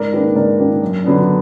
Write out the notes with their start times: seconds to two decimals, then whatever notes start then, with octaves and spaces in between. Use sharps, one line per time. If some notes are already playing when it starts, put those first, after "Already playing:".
Already playing: G#2 A#4 D5
0.13 D#3 A#3 D4 G#4 B4
0.35 G#2 A#4 D5
0.59 D#3 A#3 D4
0.82 F#2
1.04 D3 F#3 B3 D4